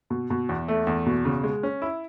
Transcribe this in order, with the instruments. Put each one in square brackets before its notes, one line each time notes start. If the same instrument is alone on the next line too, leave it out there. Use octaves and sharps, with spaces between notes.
[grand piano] B2
B2
E2
A3
E2
B2
C#3
G#3
C#4
E4